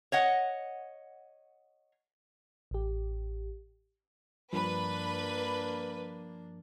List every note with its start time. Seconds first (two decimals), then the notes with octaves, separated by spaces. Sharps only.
0.12 C#5 D#5 F#5
2.71 A1 G4
4.53 G2 F3 A#3 D4 B4